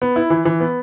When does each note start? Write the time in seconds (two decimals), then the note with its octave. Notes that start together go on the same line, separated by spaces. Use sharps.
0.02 B3
0.16 E4
0.30 E3
0.45 E3
0.60 B3